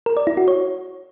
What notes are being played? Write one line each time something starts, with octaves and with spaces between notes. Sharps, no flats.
A#4
D5
E4
F#4
C#5